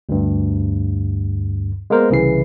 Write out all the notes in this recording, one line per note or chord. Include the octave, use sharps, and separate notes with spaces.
D2 G2
G#3 A#3 B3 A#4 C5
C2 C#3 E3 C7